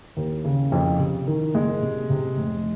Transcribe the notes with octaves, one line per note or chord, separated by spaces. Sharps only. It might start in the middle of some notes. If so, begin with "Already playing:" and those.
D#2
C#3
F2
C3
D#3
F#1 G#3
C3
C3
F1